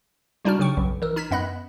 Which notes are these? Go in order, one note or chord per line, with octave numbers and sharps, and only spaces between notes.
C3 G3 D4 D#4 F#4 F6
C#3 F#3 G5 C#6
B1 F#2
E3 A#4
D#4 F6 G#6 B6 E7
F#2 B3 D#5 B5 F#6